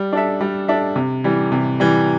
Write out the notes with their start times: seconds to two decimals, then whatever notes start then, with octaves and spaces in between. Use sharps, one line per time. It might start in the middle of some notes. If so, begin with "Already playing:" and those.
Already playing: G3
0.13 D4 A4 E5
0.41 G3
0.68 D4 A4 E5
0.96 C3
1.24 E3 G3
1.52 C3
1.80 E3 G3